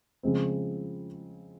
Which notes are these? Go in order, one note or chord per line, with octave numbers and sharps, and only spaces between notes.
C#3 F3 G#3 C4